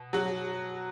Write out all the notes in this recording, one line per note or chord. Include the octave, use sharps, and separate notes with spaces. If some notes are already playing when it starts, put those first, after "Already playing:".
Already playing: B2
F#3 F#4